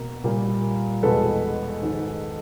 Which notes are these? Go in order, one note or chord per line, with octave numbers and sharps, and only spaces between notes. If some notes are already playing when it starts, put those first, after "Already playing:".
Already playing: B2 A#3
A#2 G3 A#3
E2 B2 G#3 A4 B4
G#2 D#3 G#3